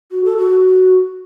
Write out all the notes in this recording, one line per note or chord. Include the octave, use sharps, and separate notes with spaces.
F#4
A4
F#4